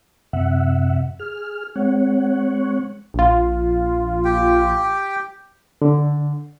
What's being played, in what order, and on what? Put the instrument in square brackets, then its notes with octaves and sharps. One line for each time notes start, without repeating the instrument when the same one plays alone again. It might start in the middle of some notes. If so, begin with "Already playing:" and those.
[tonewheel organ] F#2 C3 E5 F#5
G#4 F6
G#3 C4 C#5 F#5
[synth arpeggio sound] A#1 F4
[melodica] G4 G5
[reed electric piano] D3